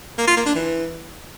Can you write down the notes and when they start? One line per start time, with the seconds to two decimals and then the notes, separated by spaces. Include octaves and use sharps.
0.18 A#3
0.27 F4
0.37 A#3
0.46 D4
0.55 E3